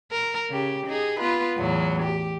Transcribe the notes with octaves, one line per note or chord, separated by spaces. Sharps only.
A#4
C#3 G4
D#4 G#4
B3 F4 B4
E2 A2 F#3
G4